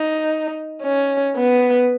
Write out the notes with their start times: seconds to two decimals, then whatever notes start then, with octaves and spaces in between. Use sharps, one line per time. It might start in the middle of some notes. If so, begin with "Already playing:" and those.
Already playing: D#4
0.83 C#4
1.36 B3